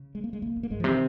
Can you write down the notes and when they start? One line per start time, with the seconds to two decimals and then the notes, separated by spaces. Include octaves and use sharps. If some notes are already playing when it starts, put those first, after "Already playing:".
Already playing: C#3
0.15 G#3
0.24 A#3
0.33 G#3
0.42 C3 A#3
0.56 G#2
0.63 A#3
0.70 G#2 G#3
0.80 F3
0.84 C3
0.89 D#3